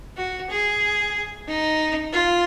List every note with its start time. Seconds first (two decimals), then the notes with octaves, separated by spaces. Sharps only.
0.17 F#4
0.50 G#4
1.48 D#4
2.13 F4